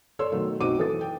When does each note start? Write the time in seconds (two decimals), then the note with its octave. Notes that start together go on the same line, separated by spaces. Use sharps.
0.19 A4 C#5 D5 C6 E6
0.32 B2 D#3 F#3 A3
0.60 B1 C4 D#4 F#4 D6 D#7
0.78 E3 A4 D#6 A6
1.01 G5